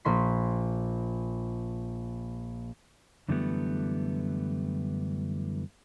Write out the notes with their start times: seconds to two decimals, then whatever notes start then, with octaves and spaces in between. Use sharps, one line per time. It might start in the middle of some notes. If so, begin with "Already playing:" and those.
0.05 A#1 A#3 C6 B6
3.28 F#2 D3 E3 G3 A3 B3